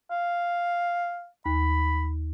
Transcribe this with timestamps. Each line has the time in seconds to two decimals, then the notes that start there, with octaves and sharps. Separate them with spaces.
0.11 F5
1.46 D#2 B5